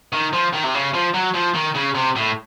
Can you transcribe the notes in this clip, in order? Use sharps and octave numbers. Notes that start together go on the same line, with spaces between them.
D#3
F3
D#3
C3
C#3
F3
F#3
F3
D#3
C#3
C3
A2